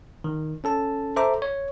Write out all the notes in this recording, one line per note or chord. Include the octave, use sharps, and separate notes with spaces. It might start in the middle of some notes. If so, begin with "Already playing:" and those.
D#3
C#4 A4 A5
A4 C5 E5 A#5 D6
C#5